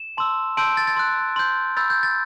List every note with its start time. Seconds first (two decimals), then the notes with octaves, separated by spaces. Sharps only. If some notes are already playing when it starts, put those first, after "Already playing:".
Already playing: E7
0.17 A5 C6 E6
0.57 A5 C6 E6 G6 D7
0.77 A6
0.87 A6
0.96 C6 F#6
1.36 C6 G6
1.77 B5 E6 G6 A6
1.90 G6
2.03 A6